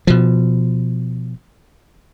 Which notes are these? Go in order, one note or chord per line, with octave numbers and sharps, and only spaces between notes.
B2 F3